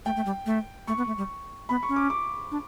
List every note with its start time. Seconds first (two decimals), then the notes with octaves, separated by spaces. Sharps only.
0.05 A3 G5
0.16 A3
0.26 G3
0.46 A3
0.87 A3 C#6
0.97 B3
1.07 A3
1.18 G3
1.69 B3 B5
1.83 C#6
1.89 C#4
1.96 D6
2.10 D6
2.51 D4